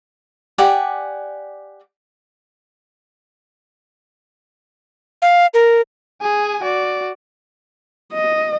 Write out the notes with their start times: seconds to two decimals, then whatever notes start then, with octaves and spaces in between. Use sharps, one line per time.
0.58 G4 D5 F#5 G#5
5.22 F5
5.54 A#4
6.22 G#4 G#5
6.62 F#4 D5
8.13 D#5